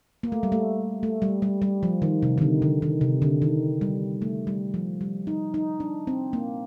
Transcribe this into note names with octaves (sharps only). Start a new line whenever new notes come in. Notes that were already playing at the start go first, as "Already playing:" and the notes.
A#3
A3
G3
A3
A3
G3
G3
G3
F3
D#3
C3
D#3
D3
D3
D#3
C3
D3
D#3
G3
A3
G3
F3
G3
D#4
D#4
D4
C4
A#3